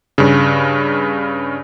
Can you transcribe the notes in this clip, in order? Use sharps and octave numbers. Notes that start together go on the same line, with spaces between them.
G2 C#3